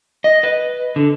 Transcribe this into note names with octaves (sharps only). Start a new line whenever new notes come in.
D#5
B4
D3